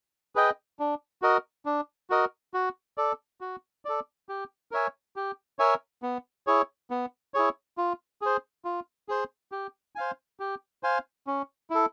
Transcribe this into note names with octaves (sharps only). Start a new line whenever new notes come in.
G#4 B4 D#5 G5
D4
F#4 A#4 D#5
D4
F#4 A#4 D#5
F#4
A4 D5
F#4
A4 D5
G4
A#4 C#5 E5 G#5
G4
A#4 C#5 E5 G#5
B3
E4 G#4 C#5
B3
E4 G#4 C#5
F4
G#4 C5
F4
G#4 C5
G4
C5 F5 G#5
G4
C5 F5 G#5
C#4
E4 A4